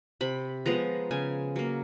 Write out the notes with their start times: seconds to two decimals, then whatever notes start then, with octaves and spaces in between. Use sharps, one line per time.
0.21 C3 B5
0.66 F3 G#3 B3 A#5
1.11 C#3 G#5
1.56 F#3 A#3